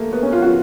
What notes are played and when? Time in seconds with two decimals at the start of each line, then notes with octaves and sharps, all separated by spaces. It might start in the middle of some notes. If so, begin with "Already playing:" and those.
Already playing: A3 A#3
0.13 B3
0.23 C#4
0.32 F4
0.42 F#4